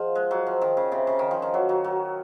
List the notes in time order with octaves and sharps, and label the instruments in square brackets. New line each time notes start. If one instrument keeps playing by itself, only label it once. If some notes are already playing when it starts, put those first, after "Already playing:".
Already playing: [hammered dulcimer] F3 [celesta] G#4 D#5 F#5
[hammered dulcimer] G#3
F#3
F3
D#3
C#3
C3
C#3
D#3
F3
D#3
[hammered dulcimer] F#3 [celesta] F#4 C#5 F#5
[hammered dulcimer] F#3
F#3